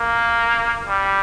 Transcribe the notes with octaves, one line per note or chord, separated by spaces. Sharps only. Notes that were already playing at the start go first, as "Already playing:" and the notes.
Already playing: A#3
G3